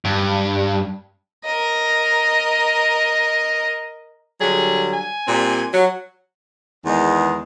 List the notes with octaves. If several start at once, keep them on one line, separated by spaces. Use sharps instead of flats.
G2
A#4 D#5
D3 F#3 G3 G#4
G#5
A#2 G3 C4
F#3
E2 D#3 G#3